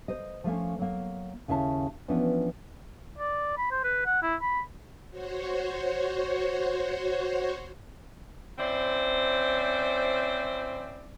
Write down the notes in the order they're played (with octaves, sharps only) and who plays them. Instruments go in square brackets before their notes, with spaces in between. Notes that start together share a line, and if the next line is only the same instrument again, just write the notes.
[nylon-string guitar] C5 D#5
F3 A3 A#3 C#4
F#3 A#3
D#2 C#3 C#4 E4 F5 A5
E3 F3 B3 C#4 D4
[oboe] D5
B5
C5
B4
F#5
E4
B5
[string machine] F#4 C5 C#5
[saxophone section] C4 C#4 E4 C5 D5